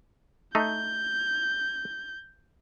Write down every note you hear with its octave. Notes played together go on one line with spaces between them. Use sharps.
A3 D#4 G6